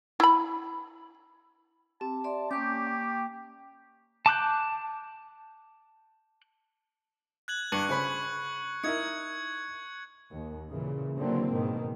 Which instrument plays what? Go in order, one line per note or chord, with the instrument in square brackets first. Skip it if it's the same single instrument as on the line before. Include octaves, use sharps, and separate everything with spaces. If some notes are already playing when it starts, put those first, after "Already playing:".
[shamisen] E4 B5
[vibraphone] C4 [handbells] G4 [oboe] A5
[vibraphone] D5 E5 C6
[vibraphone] A#3 C#6 D6 [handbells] C#4 G6 [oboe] G4
[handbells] G5
[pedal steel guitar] A5 D6 F#6 G6
[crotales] F#6 G#6 F#7
[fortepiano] G2 [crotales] C#6 C#7 F#7
[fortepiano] C#3 C5 B5
[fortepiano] D#4 E4 A#4 [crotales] G#6 C#7
[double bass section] D#2
A#2 C#3 E3
D3 E3 F#3 A#3 C4
G#2 B2 D#3